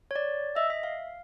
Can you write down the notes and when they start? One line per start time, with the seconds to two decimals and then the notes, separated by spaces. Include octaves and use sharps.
0.11 C#5
0.16 D5
0.56 D#5 E5
0.70 E5
0.83 F5